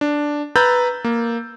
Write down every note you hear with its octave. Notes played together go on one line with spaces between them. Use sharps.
D4
B4 A#5 B5 E6 G6 A6
A#3